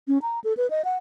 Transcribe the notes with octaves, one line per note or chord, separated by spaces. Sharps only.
C#4
A#5
A4
B4
D#5
F#5